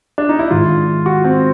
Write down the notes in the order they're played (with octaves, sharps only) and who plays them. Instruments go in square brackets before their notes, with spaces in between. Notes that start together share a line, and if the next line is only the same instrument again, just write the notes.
[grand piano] D4
D#4
E4
[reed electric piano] G#2 D#3 G#3 [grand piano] F4
[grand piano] F#4
C4